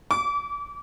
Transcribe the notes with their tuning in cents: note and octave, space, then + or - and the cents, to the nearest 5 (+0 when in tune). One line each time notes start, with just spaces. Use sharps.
D6 -30